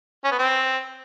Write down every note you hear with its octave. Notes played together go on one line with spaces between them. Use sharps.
C#4
B3
C4